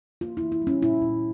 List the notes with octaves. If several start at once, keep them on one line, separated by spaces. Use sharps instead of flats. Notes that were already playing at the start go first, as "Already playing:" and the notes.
A#3 F4
E3 E4
E4
G3
C#4
A#2 E4
A#2